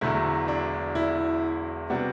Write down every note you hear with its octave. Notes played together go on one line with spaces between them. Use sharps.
E1 E2 D3 F#3 A3 E4
D4
E4
C3 G3 B3 D4 F#4